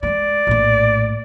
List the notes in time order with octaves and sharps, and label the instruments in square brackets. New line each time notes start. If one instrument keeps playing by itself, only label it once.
[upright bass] G#3 A3 [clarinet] D5
[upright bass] A#1 A2